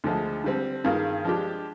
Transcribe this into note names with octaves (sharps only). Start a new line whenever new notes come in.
D2 D3 F3 G#3
D3 G3 C4
G2 D#3 A#3 F4 G#4
F3 G#3 D4 G4